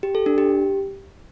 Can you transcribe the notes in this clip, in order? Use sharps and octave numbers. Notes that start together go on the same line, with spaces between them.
G4
A4
D4
G4